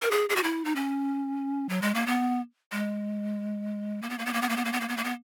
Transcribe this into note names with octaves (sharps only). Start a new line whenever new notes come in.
A#4
G#4
G#4
F#4
E4
D#4
C#4
F#3
G#3
A#3
B3
G#3
A#3
B3
A#3
B3
A#3
B3
A#3
B3
A#3
B3
A#3
B3
A#3
B3